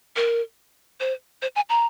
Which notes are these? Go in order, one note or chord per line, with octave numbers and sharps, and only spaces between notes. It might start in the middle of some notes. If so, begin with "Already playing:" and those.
A#4
C5
C5
G#5
A#5